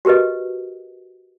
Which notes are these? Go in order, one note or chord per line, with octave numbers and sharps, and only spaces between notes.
F#4 G4 A#4 B4 D#5